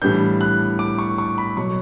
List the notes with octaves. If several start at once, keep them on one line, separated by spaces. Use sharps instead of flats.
A2 E3 G3 B3 D4 G6
F#6
D6
C#6
C#6
B5
B2 F#3 C#6